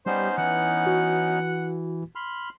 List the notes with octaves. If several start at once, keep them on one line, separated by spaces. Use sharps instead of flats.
G3 B3 C#4 D#4 C5
E3 F#5
F#4
B5 C6 F6